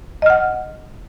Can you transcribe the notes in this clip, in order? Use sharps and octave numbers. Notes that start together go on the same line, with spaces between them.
D#5 F#5 F6